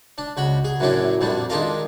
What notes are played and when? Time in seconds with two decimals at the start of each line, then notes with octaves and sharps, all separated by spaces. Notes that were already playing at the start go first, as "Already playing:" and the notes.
0.18 D4
0.37 C#2 F#4 B5
0.65 G#4
0.80 F#2 A2 F#3 C#4 D4 E4
1.21 F2 A#2 G3 D4
1.50 D#3 G#3 D4 F4 A#4